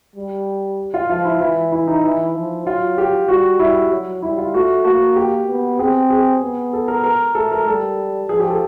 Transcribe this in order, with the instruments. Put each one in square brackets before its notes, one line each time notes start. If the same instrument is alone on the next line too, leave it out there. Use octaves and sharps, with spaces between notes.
[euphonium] G3
[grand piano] F4
[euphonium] F3 [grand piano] F4
[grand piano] E4
[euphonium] E3 [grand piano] E4
[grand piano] E4
D#4
[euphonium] E3 [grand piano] E4
[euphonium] F3
[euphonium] F#3 [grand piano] F4
[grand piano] G4
[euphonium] G3 [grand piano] F#4
[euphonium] G3 [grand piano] E4
[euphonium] F#3
[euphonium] G3 [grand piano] E4
[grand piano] F4
[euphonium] A3 [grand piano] F#4
[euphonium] A#3 [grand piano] F#4
[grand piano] G4
[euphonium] B3
[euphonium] C4 [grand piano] G#4
[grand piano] G#4
[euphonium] B3
[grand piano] A4
A#4
A#4
[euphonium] A3 [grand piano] A4
[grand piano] A#4
[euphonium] G3 [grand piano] A4
[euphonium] F3 [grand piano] G#4
[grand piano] G4
A4